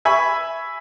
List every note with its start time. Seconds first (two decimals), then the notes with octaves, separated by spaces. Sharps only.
0.05 E5 G#5 B5 C#6